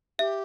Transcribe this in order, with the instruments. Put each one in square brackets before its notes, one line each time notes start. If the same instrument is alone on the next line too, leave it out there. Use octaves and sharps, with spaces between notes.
[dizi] G4 [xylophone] E5